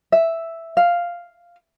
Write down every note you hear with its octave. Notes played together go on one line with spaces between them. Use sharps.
E5
F5